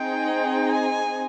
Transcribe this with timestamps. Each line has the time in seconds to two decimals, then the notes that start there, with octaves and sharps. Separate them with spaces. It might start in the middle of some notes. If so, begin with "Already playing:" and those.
Already playing: C4 D#4 G#4 G5
0.69 G#5